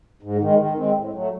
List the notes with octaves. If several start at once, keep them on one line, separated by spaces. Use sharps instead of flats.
G#2
D#3 G#3
D#3
G#3 C4
A2
F#3 A3